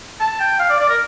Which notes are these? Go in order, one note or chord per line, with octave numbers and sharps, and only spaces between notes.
A5
G5
F5
D5
D5
A#4